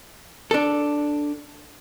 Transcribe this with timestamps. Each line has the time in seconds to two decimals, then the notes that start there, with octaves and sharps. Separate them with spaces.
0.51 D4 A4